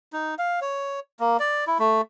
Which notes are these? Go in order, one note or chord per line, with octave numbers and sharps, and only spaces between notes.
D#4
F5
C#5
A#3
D5
E4
A3